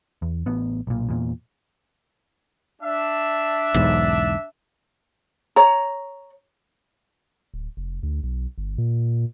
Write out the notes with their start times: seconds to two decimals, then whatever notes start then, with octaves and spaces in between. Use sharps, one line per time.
0.22 E2
0.46 A1 B3
0.87 B1 A#2
1.09 E2 A#2
2.82 D4 E5
3.74 B1 E2 G#2
5.56 C#5 A#5
7.54 D1
7.77 F1
8.03 D2
8.23 B1
8.58 G1
8.78 A#2